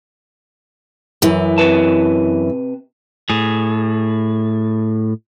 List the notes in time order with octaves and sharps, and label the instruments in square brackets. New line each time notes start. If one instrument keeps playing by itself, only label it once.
[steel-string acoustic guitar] F#2 E3
[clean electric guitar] C3 B4 A5
[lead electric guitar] A2 G#4